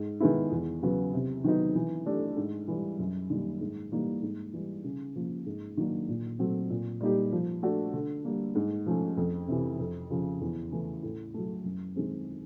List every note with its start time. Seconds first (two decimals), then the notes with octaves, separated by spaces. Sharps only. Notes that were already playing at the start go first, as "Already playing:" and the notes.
Already playing: G#2
0.20 D#3 G#3 B3 E4
0.52 E2
0.82 C#3 F#3 B3
1.13 C3
1.44 D#3 F#3 B3 D#4
1.75 E3
2.06 A3 D4 G4
2.37 G#2
2.68 E3 G3
2.99 F#2
3.30 D#3 G3 A#3
3.61 G#2
3.92 E3 G3 A#3 D#4
4.23 G#2
4.53 E3 G3
4.84 C#3
5.16 F3 A#3
5.46 G#2
5.77 D#3 F#3 A#3 D4
6.08 A#2
6.39 F#3 A3 C4
6.70 A#2
7.01 G3 A#3 D#4 G4
7.32 F3
7.63 A3 D4 F#4
7.93 D3
8.25 G3 A#3
8.55 G#2
8.86 F3 A3 C#4
9.17 F2
9.48 C3 E3
9.79 F2
10.10 C#3 F3
10.41 E2
10.72 C#3 E3 A3 C#4
11.03 A2
11.34 F#3 A3
11.64 F#2
11.96 D#3 G#3 C4